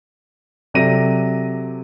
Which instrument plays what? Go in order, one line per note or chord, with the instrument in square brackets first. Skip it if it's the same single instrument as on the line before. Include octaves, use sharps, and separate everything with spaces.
[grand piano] C3 F#3 A4 D5 A#6 D#7